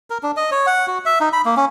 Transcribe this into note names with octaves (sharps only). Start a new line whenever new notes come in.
A#4
D4
D#5
C#5
F#5
F#4
E5
D#4
B5
A#3
C#4